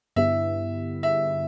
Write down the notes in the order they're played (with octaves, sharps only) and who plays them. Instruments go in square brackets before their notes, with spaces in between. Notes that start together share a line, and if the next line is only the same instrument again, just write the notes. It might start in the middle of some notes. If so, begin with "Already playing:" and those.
[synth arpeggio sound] G2 D3 B3 E4 G4 [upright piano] E5
[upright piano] E5